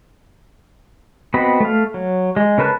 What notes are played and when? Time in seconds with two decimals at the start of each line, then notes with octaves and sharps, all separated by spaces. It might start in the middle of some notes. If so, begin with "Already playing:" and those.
1.34 B3 C4 F#4 D#5 B5
1.60 A3 F5
1.94 F#3
2.37 G#3
2.58 C#3 A#4 B4 A5 F#6